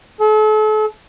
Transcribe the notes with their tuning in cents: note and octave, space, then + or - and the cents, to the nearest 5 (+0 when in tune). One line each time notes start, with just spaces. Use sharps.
A4 -40